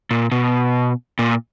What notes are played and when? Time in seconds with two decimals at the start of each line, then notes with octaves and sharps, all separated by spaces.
0.11 A#2
0.32 B2
1.19 A#2